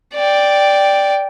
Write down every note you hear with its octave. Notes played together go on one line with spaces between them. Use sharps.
D5 G5